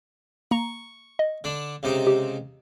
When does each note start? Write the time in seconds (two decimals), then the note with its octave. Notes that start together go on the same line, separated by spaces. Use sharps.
0.51 A#3 A#5 C#6
1.19 D#5
1.44 D3 D4
1.83 C#2 C3 D#4
2.07 G4